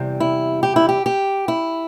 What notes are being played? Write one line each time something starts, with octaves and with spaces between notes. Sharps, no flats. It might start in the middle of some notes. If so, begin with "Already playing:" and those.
Already playing: E2 C3 G3
E4
G4
E4
G4
G4
E4